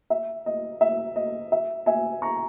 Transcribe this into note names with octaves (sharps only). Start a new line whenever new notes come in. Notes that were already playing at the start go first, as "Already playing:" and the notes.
E5
D#5
E5
D#5
E5
E5 G#5
A#5 C#6